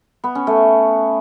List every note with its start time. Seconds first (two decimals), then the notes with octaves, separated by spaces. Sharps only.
0.24 B3
0.35 C#4
0.47 A3